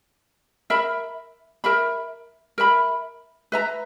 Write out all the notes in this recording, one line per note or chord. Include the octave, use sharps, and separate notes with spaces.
A#4 E5 B5
A#4 E5 B5
A#4 E5 B5
B4 E5 A#5